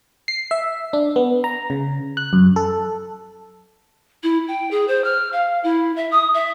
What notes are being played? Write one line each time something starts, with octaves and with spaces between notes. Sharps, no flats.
C7
E5
D4
B3
A#5
C#3
F#6
F#2
A4
E4
G5
G#4
C5
F6
F5
E4
E5
D#6
E5